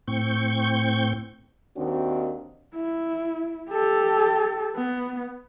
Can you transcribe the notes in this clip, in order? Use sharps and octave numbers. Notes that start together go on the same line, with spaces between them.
A2 C4 C#6 G6
D#2 D#3 C4 D4 F#4
E4
G4 A4
B3